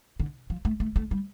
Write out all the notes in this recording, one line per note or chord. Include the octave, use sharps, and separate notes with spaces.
D3
F3
A3
A3
A3
G3